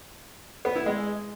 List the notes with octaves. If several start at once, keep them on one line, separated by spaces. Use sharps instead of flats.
B3
E4
G#3